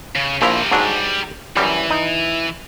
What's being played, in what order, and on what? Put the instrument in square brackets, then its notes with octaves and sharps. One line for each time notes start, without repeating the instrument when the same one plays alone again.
[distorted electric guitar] C#3
[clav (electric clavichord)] A#1 F3 E4 [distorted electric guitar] G3 A#5
[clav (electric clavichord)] G#2 F#3 D4
[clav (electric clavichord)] F#2 G3 [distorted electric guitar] E3
[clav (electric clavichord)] D#4